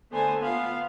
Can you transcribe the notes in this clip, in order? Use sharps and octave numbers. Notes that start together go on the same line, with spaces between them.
D3 A3 B3 C5 G#5 A5
B3 F4 F5